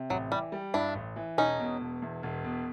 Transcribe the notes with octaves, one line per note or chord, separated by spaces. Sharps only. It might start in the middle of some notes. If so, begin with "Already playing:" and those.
Already playing: C3
A1 F#3
E3 G3
G3
G2 D4 E4
A1
E3
E1 C#4 D#4
B2
E1
E2
E1
B2